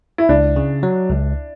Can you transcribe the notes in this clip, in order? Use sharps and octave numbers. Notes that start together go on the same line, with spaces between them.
E4
C#2 D4
C#3
F#3
C#2